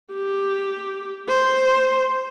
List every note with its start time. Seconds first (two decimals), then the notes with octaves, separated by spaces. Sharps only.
0.13 G4
1.28 C5